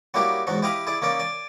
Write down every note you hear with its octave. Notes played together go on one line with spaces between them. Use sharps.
F#3 G3 A#3 D#4 E4 G4
E2 G#2 F#3 D#4
E4 G4 D#5 F5 B5 D#6
E4 G#4 D5
A#3 C#4 D#4 D5
D5 G#5